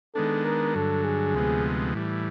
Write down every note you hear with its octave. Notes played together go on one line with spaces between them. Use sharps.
D#3 G#3 B3 D4 A4
A#4
G2 D3 F#3 A4
G#4
D2 C3 F3 G#3 B3
A2 E3 G3